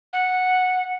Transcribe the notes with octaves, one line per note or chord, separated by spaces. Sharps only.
F#5